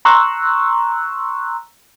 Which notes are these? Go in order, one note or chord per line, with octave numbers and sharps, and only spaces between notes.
A#5 C6 C#6 E6 F#6